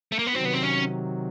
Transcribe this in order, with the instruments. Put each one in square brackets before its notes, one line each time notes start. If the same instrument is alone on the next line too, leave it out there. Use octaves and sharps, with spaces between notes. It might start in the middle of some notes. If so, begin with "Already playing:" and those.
[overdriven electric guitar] A3
A#3
B3
[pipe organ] C3 D#3 F#3 [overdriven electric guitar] C4
[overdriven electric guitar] B3
C4
C#4